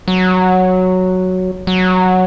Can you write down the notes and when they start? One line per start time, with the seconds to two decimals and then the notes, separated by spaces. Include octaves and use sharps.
0.08 F#3
1.67 F#3